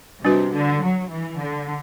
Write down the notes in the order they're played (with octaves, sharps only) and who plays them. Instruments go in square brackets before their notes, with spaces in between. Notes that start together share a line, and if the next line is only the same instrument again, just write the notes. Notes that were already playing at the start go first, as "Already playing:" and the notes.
[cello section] C3 [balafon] G3 D4 F#4 B4
[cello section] D3
F#3
E3
D3